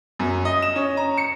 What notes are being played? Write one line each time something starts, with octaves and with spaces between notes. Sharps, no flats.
F#2
D#5
E7
C#4
A#5
C#7